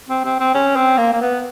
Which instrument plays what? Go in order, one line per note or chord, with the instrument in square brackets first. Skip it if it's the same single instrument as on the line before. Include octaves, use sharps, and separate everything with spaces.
[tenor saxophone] C4
C4
C4
C#4
C4
A#3
A#3
B3